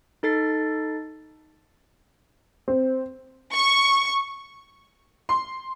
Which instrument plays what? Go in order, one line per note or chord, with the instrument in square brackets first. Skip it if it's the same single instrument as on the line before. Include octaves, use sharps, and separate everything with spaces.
[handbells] D#4 A4 A6 C7
[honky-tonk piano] C4
[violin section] C#6
[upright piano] C6